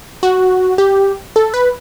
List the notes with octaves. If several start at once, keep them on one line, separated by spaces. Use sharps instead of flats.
F#4
G4
A4
B4